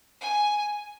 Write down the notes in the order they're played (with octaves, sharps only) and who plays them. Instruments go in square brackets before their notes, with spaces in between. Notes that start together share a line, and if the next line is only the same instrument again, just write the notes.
[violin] G#5